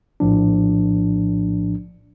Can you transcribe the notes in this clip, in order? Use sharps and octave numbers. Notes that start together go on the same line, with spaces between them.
A#1 A2 F3 D4